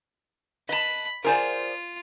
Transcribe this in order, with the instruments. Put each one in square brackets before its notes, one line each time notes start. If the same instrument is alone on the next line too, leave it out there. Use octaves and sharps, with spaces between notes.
[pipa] B4 [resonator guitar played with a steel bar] D#5 A5 [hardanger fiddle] B5
[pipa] F3 G#4 F#5 [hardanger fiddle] F4 [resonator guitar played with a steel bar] A#4 C5 D5